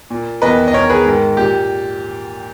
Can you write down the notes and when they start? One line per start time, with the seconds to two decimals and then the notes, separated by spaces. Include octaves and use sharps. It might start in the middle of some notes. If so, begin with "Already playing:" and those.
0.10 A#2
0.42 E2 D#3 B4 D#5
0.68 D#5
0.74 E2 D#3 A#4 C#5
0.90 G#4 B4
1.06 G#2 D#3
1.37 A#2 G4